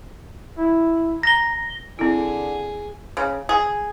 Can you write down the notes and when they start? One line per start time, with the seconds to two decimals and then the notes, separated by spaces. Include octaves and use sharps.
0.58 E4
1.23 A#5 A#6 G7
1.99 D3 C4 E4 G#4
3.17 C#3
3.49 G#4